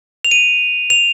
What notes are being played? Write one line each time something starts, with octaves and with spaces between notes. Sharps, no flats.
F7
D#7
F7